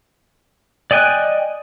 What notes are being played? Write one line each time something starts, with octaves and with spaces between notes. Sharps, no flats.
D5 D#5 G5 G#5 F#6